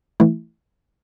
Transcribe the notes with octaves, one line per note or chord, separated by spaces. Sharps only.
E3 A3 E4